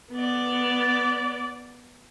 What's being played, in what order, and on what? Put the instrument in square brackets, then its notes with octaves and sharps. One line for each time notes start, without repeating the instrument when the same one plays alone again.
[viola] B3 D5